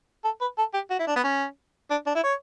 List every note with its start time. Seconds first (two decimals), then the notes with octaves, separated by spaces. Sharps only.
0.24 A4
0.41 B4
0.58 A4
0.74 G4
0.90 F#4
0.99 E4
1.07 D4
1.16 B3
1.24 C#4
1.90 D4
2.07 D4
2.15 E4
2.24 C#5